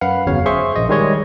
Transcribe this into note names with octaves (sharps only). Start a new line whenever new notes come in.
F#2 B4 F5 F#5
G1 E2 C#3 F#3 C#5 F5
G#4 C5 E5 C6 C#6
A#1 D#5
D#3 G3 G#3 G#4 C#5 D#5